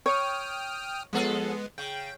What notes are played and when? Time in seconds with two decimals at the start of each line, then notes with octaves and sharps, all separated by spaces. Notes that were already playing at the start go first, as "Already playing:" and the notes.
0.06 C#5 G5 D#6 F6
1.13 F3 G#3 B3 G#4 A4
1.78 C#3 G5